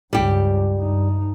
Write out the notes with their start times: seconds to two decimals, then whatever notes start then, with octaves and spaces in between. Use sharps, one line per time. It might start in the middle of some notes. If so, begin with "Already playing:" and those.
0.13 C#2 G2 G3 G4
0.77 G2 D#4